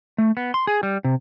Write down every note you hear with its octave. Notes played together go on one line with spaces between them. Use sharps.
A3
B3
C6
G#4
G3
C3